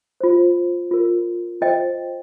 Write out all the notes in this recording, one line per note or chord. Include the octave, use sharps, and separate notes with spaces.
F4 C5
F4 A#4
F4 C5 D#5 G5